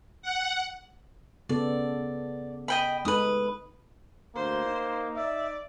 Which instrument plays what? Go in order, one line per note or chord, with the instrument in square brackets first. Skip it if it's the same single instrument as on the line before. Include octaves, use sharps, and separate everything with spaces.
[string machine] F#5
[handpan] C#3 B3 A4 [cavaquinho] D5
[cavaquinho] D#5 G5 B5
[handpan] G#3 D#4 A4 [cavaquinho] B4 D#6
[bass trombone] D2 [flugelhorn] A#3 [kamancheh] C5
[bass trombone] D#4
[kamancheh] D5 [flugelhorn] E5